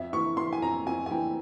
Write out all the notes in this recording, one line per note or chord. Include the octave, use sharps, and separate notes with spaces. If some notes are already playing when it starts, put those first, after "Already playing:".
Already playing: F2 E5
E3 C#6
E3 C6
G#5
F2 A#5
F2 G#5
G#5
E3 G5